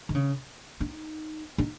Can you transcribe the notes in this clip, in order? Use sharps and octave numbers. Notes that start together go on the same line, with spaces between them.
D#3
C#3
D#4
D#4